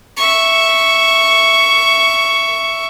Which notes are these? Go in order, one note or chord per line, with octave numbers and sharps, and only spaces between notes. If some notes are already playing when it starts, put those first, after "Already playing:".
E5 C#6